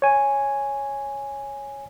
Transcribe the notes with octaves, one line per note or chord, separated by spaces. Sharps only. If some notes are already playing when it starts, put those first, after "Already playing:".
C#5 G#5